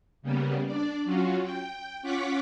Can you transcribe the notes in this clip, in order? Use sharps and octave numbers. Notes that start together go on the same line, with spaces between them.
C#3 G3 A#3 B3
D4 D5
F#3 C#4 F4 F#4
G5
C#4 F4 F#5 C#6 D6 B6